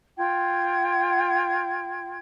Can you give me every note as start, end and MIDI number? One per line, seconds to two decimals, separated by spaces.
0.18 2.18 65
0.18 2.18 79
0.18 2.18 92